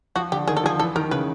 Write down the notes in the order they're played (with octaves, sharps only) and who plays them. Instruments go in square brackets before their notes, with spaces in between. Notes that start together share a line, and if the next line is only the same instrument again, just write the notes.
[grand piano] F3 [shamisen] F#4
[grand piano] D3 [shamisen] G4
[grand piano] D#3 [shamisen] G#4
[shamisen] A4
[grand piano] F3 [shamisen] G#4
[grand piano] E3 [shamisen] A4
[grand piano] D#3 [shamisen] A#4
[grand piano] C#3 [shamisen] B4